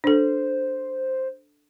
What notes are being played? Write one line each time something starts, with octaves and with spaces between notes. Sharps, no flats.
D4 A4 C5